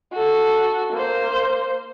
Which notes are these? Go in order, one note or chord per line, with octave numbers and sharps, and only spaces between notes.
F#4 A4
A#3 C5